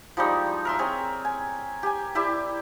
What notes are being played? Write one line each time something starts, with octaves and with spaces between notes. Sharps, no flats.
F3 G3 G#3 D#4
A#4 E5 C6
C4 G#4 C#5
G#5
G4 G#5
E4 G4 D5 E5